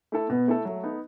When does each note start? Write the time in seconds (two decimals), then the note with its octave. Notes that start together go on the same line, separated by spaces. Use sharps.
0.12 A3 E4 A4
0.29 B2 B3
0.48 A3 E4 A4
0.65 F#3 A3
0.83 B3 D#4